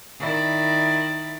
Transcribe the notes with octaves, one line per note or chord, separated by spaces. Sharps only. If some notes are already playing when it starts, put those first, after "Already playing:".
D#3 E4 D5